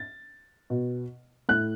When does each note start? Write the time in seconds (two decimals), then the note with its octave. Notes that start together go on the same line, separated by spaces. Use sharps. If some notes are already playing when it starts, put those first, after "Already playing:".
Already playing: A6
0.70 B2
1.49 A2 F#6